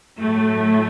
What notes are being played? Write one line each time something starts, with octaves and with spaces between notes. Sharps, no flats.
A2 F#3 A3